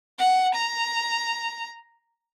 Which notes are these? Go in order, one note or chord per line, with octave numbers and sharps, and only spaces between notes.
F#5
A#5